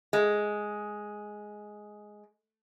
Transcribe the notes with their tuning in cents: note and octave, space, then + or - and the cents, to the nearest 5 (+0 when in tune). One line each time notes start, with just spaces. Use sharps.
G#3 +5